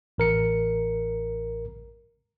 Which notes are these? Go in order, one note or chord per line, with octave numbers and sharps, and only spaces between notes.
A1 A#4 C#7